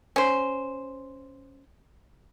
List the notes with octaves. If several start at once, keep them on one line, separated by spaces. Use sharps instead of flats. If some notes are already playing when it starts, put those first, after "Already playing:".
C#4 C5